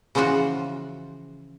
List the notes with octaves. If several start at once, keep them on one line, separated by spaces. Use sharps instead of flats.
C#3 E3 F3 F4 F#4